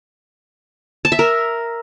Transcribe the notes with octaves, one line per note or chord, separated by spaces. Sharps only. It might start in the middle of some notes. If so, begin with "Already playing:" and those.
A5
E5
A#4